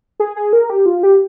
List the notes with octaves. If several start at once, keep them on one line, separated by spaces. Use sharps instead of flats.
G#4
G#4
A#4
G4
F4
G4